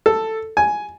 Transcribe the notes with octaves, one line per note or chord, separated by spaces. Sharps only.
A4
G#5